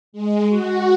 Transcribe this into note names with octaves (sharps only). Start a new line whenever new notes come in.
G#3
F#4